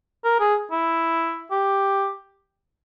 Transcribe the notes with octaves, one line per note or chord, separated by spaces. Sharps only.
A#4
G#4
E4
G4